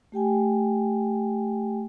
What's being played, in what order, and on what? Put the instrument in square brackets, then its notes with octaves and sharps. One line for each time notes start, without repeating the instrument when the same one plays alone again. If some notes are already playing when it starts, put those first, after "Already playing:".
[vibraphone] A3 G4 G5 G#5